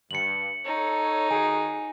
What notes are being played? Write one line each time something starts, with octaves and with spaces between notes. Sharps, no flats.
G2 C#7 F#7
D#4 A4 C#5
D#3 F#4 G#4 G#5